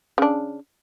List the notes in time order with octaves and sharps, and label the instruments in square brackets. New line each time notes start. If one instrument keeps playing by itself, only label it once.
[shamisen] C#3 D4